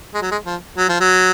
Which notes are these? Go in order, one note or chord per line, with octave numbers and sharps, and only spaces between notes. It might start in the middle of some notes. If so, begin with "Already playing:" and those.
G#3
F#3
G#3
F3
F#3
F3
F#3